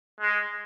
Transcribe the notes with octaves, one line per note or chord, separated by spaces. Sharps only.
G#3